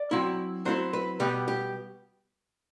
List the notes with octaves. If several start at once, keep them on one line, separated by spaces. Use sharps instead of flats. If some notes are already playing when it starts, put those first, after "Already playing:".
Already playing: D5
F#3 C4 E4
F#3 C4 E4 C5
B4
B2 G3 B3 G4
G4